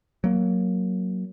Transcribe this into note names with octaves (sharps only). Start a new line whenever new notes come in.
F#3 A#3